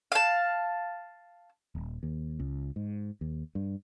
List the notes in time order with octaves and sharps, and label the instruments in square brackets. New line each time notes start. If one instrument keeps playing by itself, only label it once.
[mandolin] F5 A5
[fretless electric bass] D#1
D#2
C#2
G#2
D#2
G2